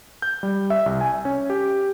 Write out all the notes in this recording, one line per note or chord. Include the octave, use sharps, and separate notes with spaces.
G6
G3
E5
C2
G#5
C#4
G4